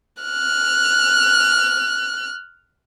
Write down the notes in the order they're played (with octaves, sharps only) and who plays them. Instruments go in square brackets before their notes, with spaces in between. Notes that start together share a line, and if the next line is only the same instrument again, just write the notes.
[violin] F6 F#6